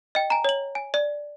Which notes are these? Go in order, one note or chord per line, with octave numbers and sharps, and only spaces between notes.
D#5 G5
G#5 A#5
C#5 F#7
G#5
D5